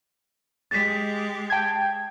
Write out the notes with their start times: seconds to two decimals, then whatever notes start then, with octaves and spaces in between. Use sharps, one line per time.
0.71 G#3 G4 A6 B6
1.50 G5 A5 G#6